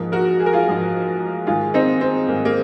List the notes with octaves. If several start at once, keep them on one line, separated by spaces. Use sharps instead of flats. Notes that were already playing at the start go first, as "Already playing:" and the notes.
Already playing: G#2 F3 A#3
F#4 A#4
G#4
A#4
F4 G#4
G#2 F3 A#3
G#2 D#3 G#3 F4 G#4
C4 D#4
C4
G#2 D#3 G#3 A#3
A#3